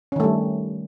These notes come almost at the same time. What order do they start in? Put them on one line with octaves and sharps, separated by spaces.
C#4 D#3 A3 G3